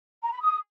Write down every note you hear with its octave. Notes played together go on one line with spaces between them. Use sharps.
A#5
B5
D#6